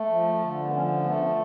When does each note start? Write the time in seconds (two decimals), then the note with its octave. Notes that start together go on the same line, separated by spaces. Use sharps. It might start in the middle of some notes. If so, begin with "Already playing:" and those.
Already playing: A3
0.09 F3
0.41 D3
0.64 B3
0.72 F3 C#4
1.04 A3 B3